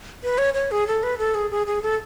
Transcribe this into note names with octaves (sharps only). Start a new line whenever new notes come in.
B4
C#5
C#5
G#4
A4
B4
A4
G#4
G#4
G#4
A4